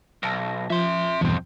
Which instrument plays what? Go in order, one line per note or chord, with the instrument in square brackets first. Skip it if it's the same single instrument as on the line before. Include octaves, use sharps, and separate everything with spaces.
[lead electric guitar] B1 [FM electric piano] A5 A#6
[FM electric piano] F3 [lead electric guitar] E5 C6
[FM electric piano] E2 G2 B2 [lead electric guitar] F3 C4